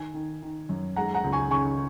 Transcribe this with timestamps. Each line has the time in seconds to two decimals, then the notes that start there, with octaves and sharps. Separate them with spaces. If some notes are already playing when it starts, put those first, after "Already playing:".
Already playing: D#3 G#5
0.14 D#3
0.42 D#3
0.69 F#2
0.96 G#3 F#5 A#5
1.14 F#5 A#5
1.24 C#2
1.32 G#5 C#6
1.50 C#3 G#5 C#6